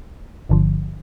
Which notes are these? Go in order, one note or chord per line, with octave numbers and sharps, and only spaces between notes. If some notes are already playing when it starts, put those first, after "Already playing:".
G1 G2 D3 F3